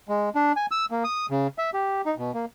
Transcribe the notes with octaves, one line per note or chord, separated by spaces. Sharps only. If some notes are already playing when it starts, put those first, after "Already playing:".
G#3
D4
G#5
E6
A#3
D#6
C#3
E5
G4
D#4
B2
A#3